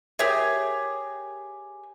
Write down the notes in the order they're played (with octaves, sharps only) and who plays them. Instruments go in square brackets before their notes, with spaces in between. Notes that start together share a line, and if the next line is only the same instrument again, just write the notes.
[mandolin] G4 G#4 [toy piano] A#4 C#5 E5